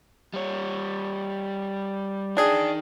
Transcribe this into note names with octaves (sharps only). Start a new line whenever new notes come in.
G3 C#5
D4 D#4 G#4 G5